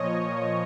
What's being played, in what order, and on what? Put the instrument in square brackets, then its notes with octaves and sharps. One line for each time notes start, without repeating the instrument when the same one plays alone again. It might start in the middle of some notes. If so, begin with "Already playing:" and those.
Already playing: [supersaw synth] A#2 F3 C#5 D#5